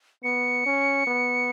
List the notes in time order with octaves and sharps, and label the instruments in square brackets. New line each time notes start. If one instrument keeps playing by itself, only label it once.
[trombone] B3 [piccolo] C#7
[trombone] C#4
B3